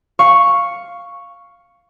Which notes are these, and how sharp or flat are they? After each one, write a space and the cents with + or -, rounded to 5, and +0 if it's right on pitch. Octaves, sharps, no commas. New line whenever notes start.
F5 +0 C#6 +0